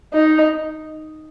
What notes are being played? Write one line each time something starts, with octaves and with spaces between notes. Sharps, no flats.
D#4